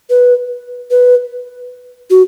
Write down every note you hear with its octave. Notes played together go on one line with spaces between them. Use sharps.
B4
B4
F#4